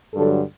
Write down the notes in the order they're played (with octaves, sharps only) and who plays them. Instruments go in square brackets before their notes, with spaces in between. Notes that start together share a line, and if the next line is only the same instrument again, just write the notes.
[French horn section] G2 D3 F#3 A4